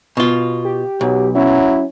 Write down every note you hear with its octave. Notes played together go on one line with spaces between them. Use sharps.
B2 F4
G4
B1 F#3
F#3 C#4 E4